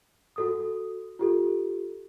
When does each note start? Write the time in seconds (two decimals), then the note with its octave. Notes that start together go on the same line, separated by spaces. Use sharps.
0.36 F#4 A4 D#6
1.19 F4 G4 A4